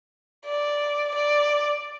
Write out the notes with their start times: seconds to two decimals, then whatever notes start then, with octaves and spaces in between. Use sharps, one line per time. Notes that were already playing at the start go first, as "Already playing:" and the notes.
0.45 D5
1.15 D5